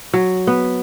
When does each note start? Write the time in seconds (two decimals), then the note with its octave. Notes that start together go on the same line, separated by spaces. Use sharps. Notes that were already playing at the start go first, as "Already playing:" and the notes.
0.14 F#3
0.47 B3